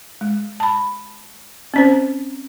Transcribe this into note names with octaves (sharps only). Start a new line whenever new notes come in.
G#3
A5 B5
C4 C#4 C5